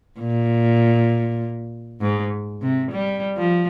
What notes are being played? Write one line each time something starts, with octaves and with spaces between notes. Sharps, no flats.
A#2
G#2
C3
G3
F3